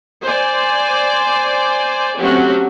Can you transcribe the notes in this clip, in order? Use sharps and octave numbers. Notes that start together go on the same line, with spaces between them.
C5 D5 G#5
F#3 A3 C4 C#4 F#4 G4